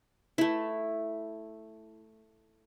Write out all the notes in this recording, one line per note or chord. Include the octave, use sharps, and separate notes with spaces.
A3 E4